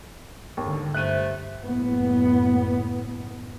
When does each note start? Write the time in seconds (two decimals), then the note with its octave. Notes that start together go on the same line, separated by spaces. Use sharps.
0.57 D#2 G#2 D3
0.94 G2 C3 A3 F#6 D#7
1.63 F#1 A2 B3